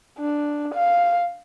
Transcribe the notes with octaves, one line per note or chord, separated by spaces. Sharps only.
D4
F5